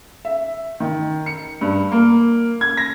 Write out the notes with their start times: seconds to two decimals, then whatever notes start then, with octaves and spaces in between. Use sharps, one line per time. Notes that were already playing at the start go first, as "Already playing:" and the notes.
0.25 E5
0.80 D#3
1.26 C#7
1.61 G2
1.92 A#3
2.61 G#6
2.77 A#6